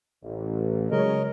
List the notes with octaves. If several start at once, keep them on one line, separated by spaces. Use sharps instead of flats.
A1
C#3 F#3 G#3 G#4 A#4 C#5 D#5